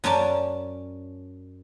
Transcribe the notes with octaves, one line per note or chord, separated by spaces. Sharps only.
F#2 C#4 D5 A5